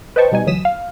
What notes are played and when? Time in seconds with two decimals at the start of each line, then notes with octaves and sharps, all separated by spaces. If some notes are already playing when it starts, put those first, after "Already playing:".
0.16 B4 C5 D#5 G5 A5 C#6
0.32 B2 G3 D#4 G#5
0.47 D2 E3 F#3 D#6 B6 E7
0.65 F5